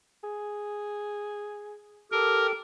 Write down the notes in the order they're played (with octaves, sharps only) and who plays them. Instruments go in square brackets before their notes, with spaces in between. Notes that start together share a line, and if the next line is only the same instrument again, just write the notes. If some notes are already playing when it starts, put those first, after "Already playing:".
[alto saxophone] G#4
[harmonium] G4 A4 [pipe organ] A#4